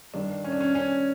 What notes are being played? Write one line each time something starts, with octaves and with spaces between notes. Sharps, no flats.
G2 D#3 G3 D4
C#4
D4
C#4
C#4